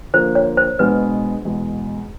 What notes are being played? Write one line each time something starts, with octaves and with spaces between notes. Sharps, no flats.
D3 F3 A#3 C5
C#5
C5
B2 G#3 B3 D4 B4
E2 B2 G#3